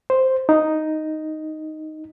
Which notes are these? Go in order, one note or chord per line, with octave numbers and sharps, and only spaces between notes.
C5
D#4